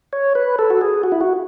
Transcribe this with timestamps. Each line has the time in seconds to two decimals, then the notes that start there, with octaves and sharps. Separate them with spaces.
0.13 C#5
0.35 B4
0.59 A4
0.70 F#4
0.81 G#4
1.03 F#4
1.12 E4
1.21 F#4